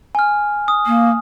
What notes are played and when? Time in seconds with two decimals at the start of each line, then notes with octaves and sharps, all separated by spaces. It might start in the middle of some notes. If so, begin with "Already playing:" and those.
0.15 G#5 F6
0.68 D#6
0.86 A#3